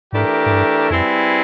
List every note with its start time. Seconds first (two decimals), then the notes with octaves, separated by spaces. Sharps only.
0.13 G#2 E3 A3 D4 G4 A#4
0.46 G#2
0.51 G2
0.90 F2 G3 C4 E4 G#4 B4